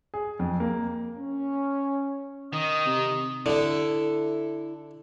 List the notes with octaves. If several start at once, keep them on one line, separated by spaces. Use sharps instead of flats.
G#4
F2
A#3
C#4
D#3 D#5
C3
D3 E4 A4